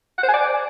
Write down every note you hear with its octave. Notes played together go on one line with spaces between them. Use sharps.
F#5
C5
G#5
D5